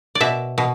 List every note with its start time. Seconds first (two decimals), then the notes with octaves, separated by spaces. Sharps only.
0.15 D5
0.20 B2 E5
0.58 B2